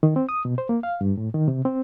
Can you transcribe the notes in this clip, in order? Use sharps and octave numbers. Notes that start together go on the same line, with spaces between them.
D#3
C4
D#6
B2
C5
A#3
F5
G2
A2
D#3
C3
C4